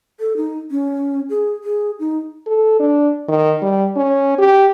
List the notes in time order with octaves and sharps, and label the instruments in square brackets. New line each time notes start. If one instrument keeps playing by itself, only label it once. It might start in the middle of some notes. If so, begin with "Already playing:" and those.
[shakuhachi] A4
D#4
C#4
G#4
G#4
D#4
[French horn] A4
D4
D#3
G3
C#4
G4